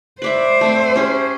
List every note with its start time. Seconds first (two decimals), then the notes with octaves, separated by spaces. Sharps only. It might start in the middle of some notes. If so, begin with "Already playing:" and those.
0.22 B4 C5 D5 E5
0.61 A3 C4 D6
0.96 C#4 G4 G#4